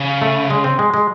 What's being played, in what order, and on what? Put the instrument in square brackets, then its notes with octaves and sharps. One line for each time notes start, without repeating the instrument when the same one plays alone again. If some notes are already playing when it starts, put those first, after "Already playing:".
Already playing: [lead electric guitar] C#3
[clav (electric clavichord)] A3
G#3
C4
G#3
G#3